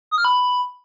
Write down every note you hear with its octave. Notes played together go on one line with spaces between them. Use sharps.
D#6
F6
B5